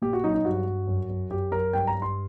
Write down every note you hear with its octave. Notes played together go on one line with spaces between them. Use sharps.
A#2 G4
F#4
F#3 D#4
D#4
G2 F#4
G2
F#2
F#2
F#2 G4
F#3 A#4
G2 G5
A#5
G2
C6